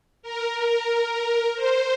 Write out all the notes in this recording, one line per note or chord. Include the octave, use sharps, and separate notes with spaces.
A#4
C5